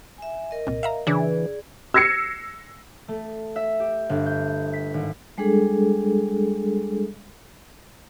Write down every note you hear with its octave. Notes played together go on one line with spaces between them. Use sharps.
E5 G#5
A#4 D#5
C2 A#2
E5 F5 A#5
C#3 E3 D4 G#4 D5
E6 G#6 A#6 C7 C#7
A3
E5
G4
G1
G6
B6
G#1
G3 G#3 D4 G#4 A4